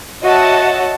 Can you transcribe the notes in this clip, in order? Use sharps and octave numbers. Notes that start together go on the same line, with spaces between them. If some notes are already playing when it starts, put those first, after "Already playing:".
F#4 C#5 D#5 E5 F#5 A5